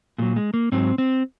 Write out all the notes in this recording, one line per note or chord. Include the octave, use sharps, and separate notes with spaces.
A#2 F#3 G#3
G#3
A#3
G#2 F#3 C4
C4